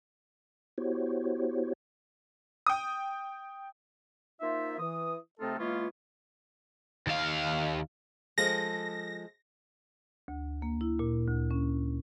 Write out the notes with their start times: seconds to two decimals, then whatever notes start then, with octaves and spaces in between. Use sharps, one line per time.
0.78 B3 E4 F#4 G4 C5 C#5
2.67 G5 D#6
4.40 A#3 D#4 F4 C5 E5
4.79 E3 D#6
5.40 C3 A3 C4 D#4 F4 A4
5.58 E3 G#3 A#3 B3 C#4 F4
7.07 D#2 F5
8.38 F3 G#3 A4 A#6
10.28 D2
10.62 A#3
10.81 E4
10.99 A#2
11.27 D2
11.51 C#4